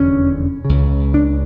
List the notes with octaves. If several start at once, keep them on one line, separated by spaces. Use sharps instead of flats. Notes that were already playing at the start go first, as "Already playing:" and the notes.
Already playing: F1 E2 D3 C#4
C#2 C#3
D4